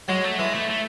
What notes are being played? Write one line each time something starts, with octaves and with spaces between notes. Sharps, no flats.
F#3 G#3
A3
E3 G#3
A3
A3